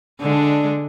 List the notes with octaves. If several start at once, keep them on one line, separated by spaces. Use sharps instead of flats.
D3 G#3 D4